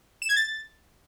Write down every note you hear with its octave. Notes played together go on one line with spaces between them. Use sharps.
E7
G#6
A6